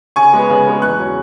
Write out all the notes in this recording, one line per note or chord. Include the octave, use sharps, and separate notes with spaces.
C#3 G#5 C#6
G#3 B3
C#3
G#3 B3
E2 C#6 F#6
C#3 F#3 C#4